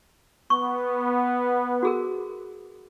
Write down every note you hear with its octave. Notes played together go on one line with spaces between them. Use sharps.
B3 C#6
F#4 G#4 A#4